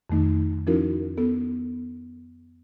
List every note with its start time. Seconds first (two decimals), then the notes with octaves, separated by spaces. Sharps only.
0.10 F2 D#3 A3 D#4
0.67 F3 C#4 D#4 E4 F#4 A#4
1.17 B3 A4